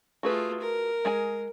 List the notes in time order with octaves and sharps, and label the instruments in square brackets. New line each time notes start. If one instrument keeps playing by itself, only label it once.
[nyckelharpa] A3 F4 [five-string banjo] F#4 G#4 B4
[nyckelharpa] A#4
[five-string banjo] G#3 G#4 G#5